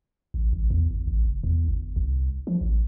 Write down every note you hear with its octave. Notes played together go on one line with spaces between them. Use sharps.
A1
A1
E2
G1
A1
F#1
E2
G1
C2
F3
A1